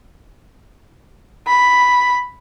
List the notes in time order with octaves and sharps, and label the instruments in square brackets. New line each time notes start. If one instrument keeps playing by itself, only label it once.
[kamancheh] B5